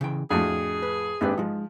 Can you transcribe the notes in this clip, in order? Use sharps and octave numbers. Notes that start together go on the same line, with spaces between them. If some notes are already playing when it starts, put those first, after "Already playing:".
C#3 E3 G5
F2 A2 D4 F#4 G#4
B4
G#1 A#3 C4 D4 G4 B4
F3 G#3 D#4